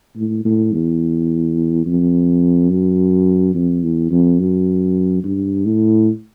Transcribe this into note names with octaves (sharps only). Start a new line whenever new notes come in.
A2
A2
E2
F2
F#2
F2
E2
F2
F#2
G2
A2